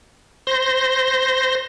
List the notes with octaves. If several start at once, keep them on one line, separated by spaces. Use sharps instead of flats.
C5 C6 A#6